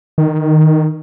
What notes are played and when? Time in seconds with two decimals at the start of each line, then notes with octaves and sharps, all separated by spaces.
0.18 D#3